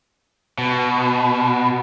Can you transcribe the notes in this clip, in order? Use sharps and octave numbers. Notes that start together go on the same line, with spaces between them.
B2